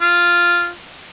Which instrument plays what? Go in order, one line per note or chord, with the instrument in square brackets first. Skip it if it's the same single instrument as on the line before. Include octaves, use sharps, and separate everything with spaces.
[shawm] F4